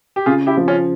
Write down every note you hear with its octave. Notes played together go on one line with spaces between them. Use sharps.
G4
C#3 F4 G#4
E4 G4
F3
C#4 F4